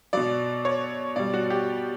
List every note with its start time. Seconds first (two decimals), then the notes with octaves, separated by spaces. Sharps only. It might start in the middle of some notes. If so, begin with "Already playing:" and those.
0.13 B2 F#3 D5
0.65 C#5
1.16 B2 G3 D5
1.34 F#4
1.50 G4